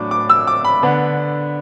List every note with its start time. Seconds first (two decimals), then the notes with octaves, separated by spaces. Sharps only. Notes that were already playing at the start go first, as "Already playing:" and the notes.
Already playing: A2 F#3 D4 D6
0.11 D6
0.30 E6
0.47 D6
0.65 B5
0.82 D3 B3 D4